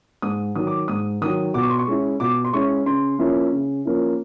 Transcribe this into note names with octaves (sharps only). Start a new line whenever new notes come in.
G#2 D#6
D#3 F#3 D#6
D6
G#2 D#6
D#3 F#3 D#6
B2 D6
C#6
C6
C#6
G#3 C#4 E4
B2 D6
C6
G#3 C#4 E4 C#6
C#3 C6
F3 A#3 C#4 E4
C#3
F3 A#3 C#4 E4